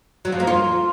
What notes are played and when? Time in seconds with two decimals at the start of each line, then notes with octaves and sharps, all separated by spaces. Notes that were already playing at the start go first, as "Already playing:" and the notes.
0.25 F#3
0.32 F3
0.40 A#3
0.47 F4